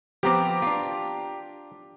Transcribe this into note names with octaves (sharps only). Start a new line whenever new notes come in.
F3 B3 C4 G4 A#5 D6
D4 F4